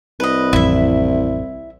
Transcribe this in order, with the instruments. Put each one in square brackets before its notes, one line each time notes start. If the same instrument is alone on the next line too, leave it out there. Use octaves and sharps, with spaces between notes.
[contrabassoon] C2 [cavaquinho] B4 D#5
[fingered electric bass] A1 F2 [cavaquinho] E4 E5